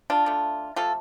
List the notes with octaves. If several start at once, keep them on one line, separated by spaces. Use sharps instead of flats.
D4 F4
D3 A3
C3 F3 A3 F4 A4